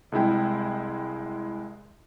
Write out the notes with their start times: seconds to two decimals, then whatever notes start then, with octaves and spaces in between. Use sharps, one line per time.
0.12 C2 G#3 E4 G5